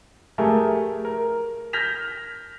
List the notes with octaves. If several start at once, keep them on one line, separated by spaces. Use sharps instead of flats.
A3 G4 G#4 A#4 A5
A#4
F6 G6 A#6 B6 F7